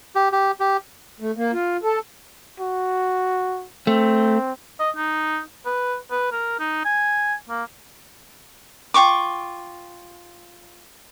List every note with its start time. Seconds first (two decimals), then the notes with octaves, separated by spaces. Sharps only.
0.15 G4
0.32 G4
0.60 G4
1.20 A3
1.37 A#3
1.52 F4
1.83 A4
2.60 F#4
3.87 A3 C4
4.80 D#5
4.96 D#4
5.65 B4
6.11 B4
6.32 A#4
6.59 D#4
6.85 G#5
7.49 A#3
8.94 F4 G5 C#6 D6